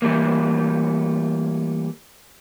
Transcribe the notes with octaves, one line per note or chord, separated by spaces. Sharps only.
E3 G3 A3 A#3